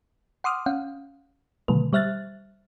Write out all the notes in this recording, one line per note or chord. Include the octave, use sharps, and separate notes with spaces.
F#5 C6 D6 D#6 F6
C#4 F5 F#5
B2 D3 D#3 F#3 A3 B4
G3 C5 E5 F6 F#6 A6